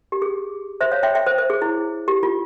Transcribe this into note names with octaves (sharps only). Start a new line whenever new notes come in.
G4
G#4
C5 E5
C#5 F5
E5 G5
E5 G5
C5
C5
G#4
E4
G4
F4